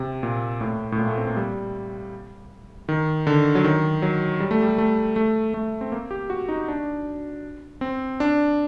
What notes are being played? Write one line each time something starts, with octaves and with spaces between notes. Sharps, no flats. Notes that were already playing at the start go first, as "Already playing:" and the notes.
Already playing: C3
A#2
A2
A2
A#2
A3
C4
A#3
G3
D#3
D3
F#3
D#3
F#3
G3
A3
G3
A3
A3
A3
C4
A#3
G4
F#4
D#4
D4
C4
D4